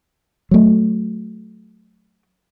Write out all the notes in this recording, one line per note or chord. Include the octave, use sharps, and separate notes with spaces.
F#3 A3